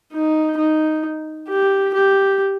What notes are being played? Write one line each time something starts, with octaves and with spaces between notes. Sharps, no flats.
D#4
D#4
G4
G4